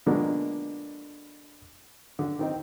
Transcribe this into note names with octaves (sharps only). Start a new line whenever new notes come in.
B2 D3 F3 G#3 A#3 D4
D3
D#3 C4 D#4